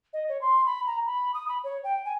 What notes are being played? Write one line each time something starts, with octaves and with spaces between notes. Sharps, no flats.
D#5
C#5
C6
B5
A#5
B5
D#6
B5
C#5
G5
G#5